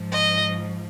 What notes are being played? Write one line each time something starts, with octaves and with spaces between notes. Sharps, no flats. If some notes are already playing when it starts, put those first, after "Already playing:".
Already playing: G#2 F3
D#5